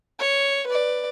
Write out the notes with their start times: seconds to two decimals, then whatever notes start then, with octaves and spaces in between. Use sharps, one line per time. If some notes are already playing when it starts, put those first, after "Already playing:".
0.19 C#5
0.67 B4 D5